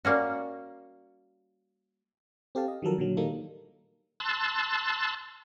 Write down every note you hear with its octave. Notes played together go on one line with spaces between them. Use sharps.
G3 A#3 C#4 F#4
C4 G4 A4 F5 A5
D#5
D#3 F3 F#3 A4 A#4
A#2 D3 F#3
A#2 D#3 G3 A#3 D#4 A4
A5 C6 E6 F#6 A6